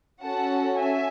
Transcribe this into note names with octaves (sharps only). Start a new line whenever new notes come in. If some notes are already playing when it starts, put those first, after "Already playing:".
C#4 F#4 A4 F#5 A5
E5 G#5